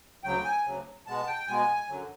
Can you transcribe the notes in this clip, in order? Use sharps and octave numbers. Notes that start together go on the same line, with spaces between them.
D2 C#3 F#3 G5
G#5
D2 C#3 F#3
B2 G#3 B3 A5
G5
B2 G#3 B3 G#5
F#2 D3 F#3